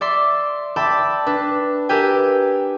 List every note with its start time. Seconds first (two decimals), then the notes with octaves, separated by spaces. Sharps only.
0.01 D5 E5 C6 D6
0.76 D5 E5 G5 A5 B5
1.26 D4 B4
1.89 G4 A#4 B4 E5 G5 G#5